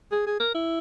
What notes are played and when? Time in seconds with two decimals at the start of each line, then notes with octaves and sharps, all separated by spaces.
0.12 G#4
0.26 G#4
0.40 A#4
0.54 E4